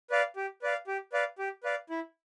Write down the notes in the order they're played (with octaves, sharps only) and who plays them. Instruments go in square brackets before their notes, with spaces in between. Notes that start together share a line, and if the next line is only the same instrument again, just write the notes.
[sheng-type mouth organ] B4 D5 F5
G4
B4 D5 F5
G4
B4 D5 F5
G4
B4 D5 F5
E4